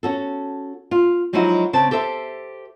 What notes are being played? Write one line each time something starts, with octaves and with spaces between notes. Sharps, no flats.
C#4 F#4 A4
F4
F3 F#3 G#3 D#4 E4 F#4
C#3 C4 A5
G4 A4 C5 E5